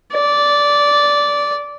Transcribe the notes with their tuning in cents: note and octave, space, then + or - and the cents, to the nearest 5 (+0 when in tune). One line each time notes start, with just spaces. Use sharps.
D5 -10